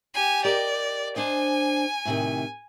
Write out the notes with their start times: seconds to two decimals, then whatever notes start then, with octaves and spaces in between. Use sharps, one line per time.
0.14 G4 G#5
0.45 G4 A#4 D5 D#5
1.16 D4 C5 D#5 G#5
2.05 A2 C3 D#3